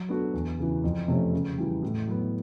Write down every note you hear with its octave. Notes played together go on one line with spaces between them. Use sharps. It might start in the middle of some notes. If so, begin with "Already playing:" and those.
Already playing: F#3
B3 D4 F#4 A4
E2
C#3 E3
F2
C3 F3 A3 C#4
C#3
E3 G3
A2
F#3 B3